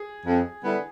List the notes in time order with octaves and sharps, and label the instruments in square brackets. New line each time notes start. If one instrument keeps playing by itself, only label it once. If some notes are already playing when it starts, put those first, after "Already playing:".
Already playing: [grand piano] G#4
[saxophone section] F2
D3 G3 B3 E4